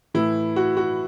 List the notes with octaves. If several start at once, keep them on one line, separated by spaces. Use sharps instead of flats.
A2 E3 E4
F#4
F#4